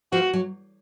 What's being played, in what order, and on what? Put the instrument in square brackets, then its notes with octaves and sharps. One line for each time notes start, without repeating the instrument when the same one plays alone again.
[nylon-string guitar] F3 [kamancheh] F#4
[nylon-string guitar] F#3